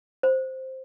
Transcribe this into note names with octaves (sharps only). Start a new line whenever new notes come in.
C5